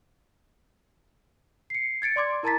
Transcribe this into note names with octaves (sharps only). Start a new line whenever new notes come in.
C7 C#7
G#6 A6 C#7 D7
D5 C6 D6 G#6
E4 A#4 A5 A#5 A6 B6